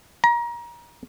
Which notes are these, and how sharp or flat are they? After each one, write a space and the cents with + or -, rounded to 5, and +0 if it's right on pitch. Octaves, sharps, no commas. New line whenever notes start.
A#5 +30